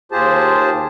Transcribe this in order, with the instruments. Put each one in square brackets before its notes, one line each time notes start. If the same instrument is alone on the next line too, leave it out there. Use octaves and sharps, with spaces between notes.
[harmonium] D#2 F4 G4 G#4 C5 A5